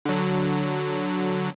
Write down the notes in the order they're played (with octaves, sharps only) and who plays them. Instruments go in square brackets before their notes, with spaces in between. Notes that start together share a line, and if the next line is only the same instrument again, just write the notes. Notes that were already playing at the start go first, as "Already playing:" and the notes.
[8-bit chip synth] D3 F#3